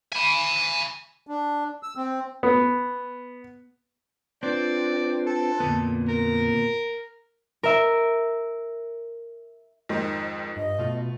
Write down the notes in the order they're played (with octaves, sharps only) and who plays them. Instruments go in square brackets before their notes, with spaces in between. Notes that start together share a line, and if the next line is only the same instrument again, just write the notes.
[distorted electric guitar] G#5 B5
[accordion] D4
E6
C4
[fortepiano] B3
[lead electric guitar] C4 [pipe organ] D4 F4 B4 [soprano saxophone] D5
[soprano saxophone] A4
[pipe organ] F2 D3 [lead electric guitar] A#2 B3
[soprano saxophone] A#4
[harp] A#4 E5
[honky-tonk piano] F2 G#2 D#3
[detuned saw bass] G2 [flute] D#5
[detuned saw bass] B2 [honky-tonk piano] A3 F4